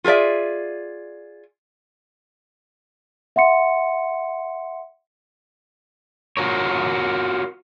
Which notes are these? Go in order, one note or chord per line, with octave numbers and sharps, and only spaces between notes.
F4 G#4 A4 D5 E5
E5 F#5 C6 C#7
F4 F#4 A#4 C#5